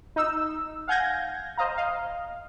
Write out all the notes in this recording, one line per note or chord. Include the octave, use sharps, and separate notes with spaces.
D#4 E6
F5 F#5 G#5 G6 G#6 A#6
C5 D#5 F5 A#5
D#5 F5